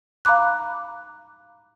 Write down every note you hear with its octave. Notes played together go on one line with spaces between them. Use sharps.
F5 A#5 B5 D6 F#6